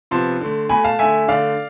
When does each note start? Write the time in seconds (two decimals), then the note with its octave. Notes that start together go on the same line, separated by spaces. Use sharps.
0.11 C3 F3 B3 A5 C6
0.41 D3 A3
0.69 B2 A3 G#5 B5
0.84 F5 A5
0.99 D3 A3 E5 G#5
1.28 D3 A3 D5 F5